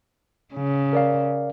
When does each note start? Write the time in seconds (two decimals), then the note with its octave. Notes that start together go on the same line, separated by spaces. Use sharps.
0.55 C#3
0.93 A#4 D5 F5